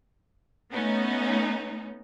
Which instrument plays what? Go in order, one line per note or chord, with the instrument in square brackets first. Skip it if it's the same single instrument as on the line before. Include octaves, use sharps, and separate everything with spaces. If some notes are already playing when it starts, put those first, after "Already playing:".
[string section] A3 B3 C#4 D#4